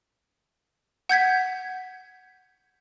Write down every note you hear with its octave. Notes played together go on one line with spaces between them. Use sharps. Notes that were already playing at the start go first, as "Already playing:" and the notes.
F#5 G6 G#6 B6